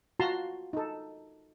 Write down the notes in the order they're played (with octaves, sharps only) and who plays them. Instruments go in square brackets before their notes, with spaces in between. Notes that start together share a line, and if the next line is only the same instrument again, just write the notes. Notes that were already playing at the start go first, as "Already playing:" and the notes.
[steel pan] F4 F#4 A5 A#5 C6
D#4 A4